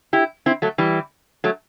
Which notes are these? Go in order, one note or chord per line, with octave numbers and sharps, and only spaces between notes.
E4 G4
C4 E4
F#3 A3
E3 G3
F#3 A3